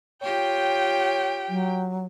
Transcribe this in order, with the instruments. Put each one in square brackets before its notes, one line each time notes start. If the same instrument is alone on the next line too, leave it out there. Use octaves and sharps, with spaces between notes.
[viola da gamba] F4 G4 [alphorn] C#5 [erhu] G5
[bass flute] F#3